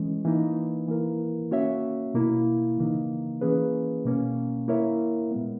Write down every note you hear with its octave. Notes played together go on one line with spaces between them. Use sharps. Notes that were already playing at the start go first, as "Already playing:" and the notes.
Already playing: E3 G#3 C#4
E3 A#3 D#4
E3 A#3 E4 A#4
A#3 C#4 F#4 C#5 E5
B2 A#3 E4
C#3 E3 A#3 D#4
E3 A#3 C#4 G#4 B4
B2 A#3 C#4
A#3 E4 A#4 C#5 E5
A#2 G#3 B3